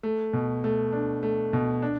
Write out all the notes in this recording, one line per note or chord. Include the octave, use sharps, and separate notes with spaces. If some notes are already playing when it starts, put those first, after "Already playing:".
A3
B2
A3
D4
A3
B2
D4